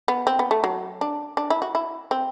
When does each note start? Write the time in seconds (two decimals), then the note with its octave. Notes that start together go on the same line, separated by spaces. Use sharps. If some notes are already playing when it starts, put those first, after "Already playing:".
0.08 B3
0.27 C4
0.39 B3
0.51 A3
0.64 F#3
1.01 D4
1.37 D4
1.50 E4
1.62 F#4
1.75 E4
2.11 C4